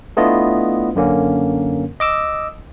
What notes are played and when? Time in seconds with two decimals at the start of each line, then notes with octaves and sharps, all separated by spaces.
0.17 A3 B3 D4 E4 F4 D#5
0.95 F#2 D3 A#3 C#4
2.00 D#5 D6 E6